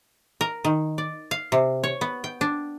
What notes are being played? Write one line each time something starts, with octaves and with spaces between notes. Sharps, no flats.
A#4
D#3
D5
F5
C3
C#5
B3
G5
D4